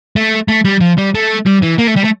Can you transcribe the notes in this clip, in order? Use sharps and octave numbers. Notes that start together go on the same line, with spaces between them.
A3
A3
G3
F3
G3
A3
G3
E3
A#3
A3
G3
A3